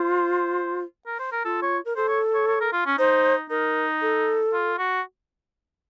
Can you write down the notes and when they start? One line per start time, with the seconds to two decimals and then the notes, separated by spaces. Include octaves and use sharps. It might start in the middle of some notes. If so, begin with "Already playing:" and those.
Already playing: F4 C5
1.06 A#4
1.19 C5
1.32 A#4
1.45 F4 A4
1.62 C#5
1.85 A#4
1.96 A4 C5
2.09 C#5
2.34 C#5
2.48 C#5
2.61 A#4
2.73 F4
2.86 C#4
2.99 D#4 C5
3.50 D#4 A#4
4.02 A4
4.53 F4
4.78 F#4